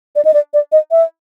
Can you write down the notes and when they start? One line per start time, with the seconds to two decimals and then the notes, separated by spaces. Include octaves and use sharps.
0.16 D5
0.25 D#5
0.34 D5
0.54 D5
0.72 D#5
0.91 E5